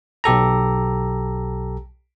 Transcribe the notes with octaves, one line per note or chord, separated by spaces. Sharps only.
B1 G4 A4 A#5